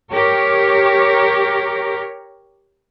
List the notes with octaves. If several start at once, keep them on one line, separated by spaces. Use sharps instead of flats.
G4 A#4 C#5